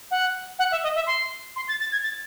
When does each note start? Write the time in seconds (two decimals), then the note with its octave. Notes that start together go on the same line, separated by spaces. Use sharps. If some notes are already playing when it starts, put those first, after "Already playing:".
0.11 F#5
0.59 F#5
0.71 E5
0.83 D#5
0.95 E5
1.07 C6
1.56 C6
1.68 A6
1.80 A6
1.92 G#6
2.03 A6